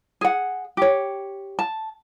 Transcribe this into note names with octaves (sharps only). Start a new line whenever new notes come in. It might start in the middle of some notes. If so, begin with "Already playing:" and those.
G#4 F#5
G4 C#5
A5